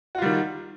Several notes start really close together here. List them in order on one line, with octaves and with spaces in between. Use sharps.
F#4 F4 G3 D#3